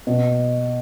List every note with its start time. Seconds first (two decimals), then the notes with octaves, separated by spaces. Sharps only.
0.07 B2